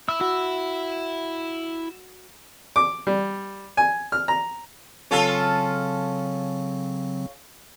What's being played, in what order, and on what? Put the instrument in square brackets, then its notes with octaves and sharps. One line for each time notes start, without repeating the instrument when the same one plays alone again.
[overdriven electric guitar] E4 [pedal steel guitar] E6
[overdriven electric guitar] E4 [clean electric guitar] F#4
[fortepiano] D6
G3
G#5
F6
A#5
[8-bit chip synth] C#3 F#3 C4 [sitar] C#4 F4 A4